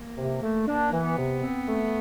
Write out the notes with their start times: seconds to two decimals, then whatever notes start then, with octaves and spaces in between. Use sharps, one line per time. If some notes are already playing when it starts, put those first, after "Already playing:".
Already playing: A#3
0.17 C3
0.42 A3
0.67 A#3 D4
0.92 E3
1.05 B3
1.17 C3
1.42 C4
1.68 A3